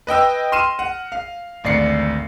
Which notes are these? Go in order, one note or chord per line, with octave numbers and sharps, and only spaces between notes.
B4 D#5 G5 E6
C6 F6 D#7 E7
F#5
F5
G#1 D2 D5 C7 C#7